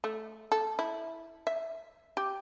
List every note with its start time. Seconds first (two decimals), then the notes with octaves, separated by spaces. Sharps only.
0.04 A3
0.52 A4
0.79 E4
1.47 E5
2.17 G4